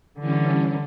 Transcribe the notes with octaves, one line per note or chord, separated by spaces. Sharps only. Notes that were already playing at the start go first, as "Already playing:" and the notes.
D3 E3 G3 C#4